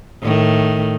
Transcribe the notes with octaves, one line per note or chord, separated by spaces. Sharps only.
A2 D#3